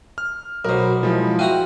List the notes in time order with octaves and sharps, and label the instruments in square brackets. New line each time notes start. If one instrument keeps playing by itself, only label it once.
[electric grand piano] F6
[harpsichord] B1 B2 [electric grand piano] A#4 C5
[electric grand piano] F3 G#3 E4
[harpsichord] F4 F#4 A#5 [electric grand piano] E5 G5 D#7